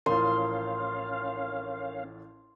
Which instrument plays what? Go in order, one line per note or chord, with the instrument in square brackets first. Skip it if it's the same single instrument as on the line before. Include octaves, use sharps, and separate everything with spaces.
[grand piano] A1 A2 F3 [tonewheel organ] C#4 F5 [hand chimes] A#4 [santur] C6